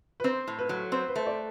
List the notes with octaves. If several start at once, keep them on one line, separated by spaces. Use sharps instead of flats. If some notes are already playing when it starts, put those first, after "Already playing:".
B4
C4 C5
A2
B4
F#3
C4 C5
B4
A3 C5
D5